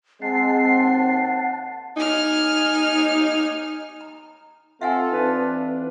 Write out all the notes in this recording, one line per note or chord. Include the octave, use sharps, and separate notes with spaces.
G#3 C4 F#5 A5 C7
D#2
D#4 G#5 F6
A#5
C4 F4 A4 E5 F#5 G#5
E3 C4 D4 D#4 B4